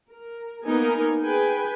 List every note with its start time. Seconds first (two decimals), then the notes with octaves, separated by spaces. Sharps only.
0.11 A#4
0.65 A#3 B3 D#4 A#4 G#5
1.24 G#4 B4 G5 G#5